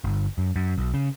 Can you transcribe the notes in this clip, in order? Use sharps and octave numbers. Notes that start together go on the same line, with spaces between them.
G1
F#2
F#2
B1
C#3